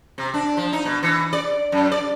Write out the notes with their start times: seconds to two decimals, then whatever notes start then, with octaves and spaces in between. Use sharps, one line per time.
0.18 C3
0.34 D4
0.57 F3
0.73 D#4
0.85 B2
1.03 E3
1.33 D5
1.72 F#2
1.92 D5